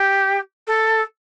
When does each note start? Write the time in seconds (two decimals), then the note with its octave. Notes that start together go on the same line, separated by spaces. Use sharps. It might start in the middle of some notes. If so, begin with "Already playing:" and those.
Already playing: G4
0.67 A4